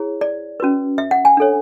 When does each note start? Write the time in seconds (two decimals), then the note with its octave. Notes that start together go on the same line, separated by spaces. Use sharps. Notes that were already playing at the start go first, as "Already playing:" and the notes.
Already playing: E4 G#4 C#5
0.21 D5
0.60 C#4 F#4 B4
0.98 E5
1.11 F#5
1.25 G#5
1.37 D4 A4 C#5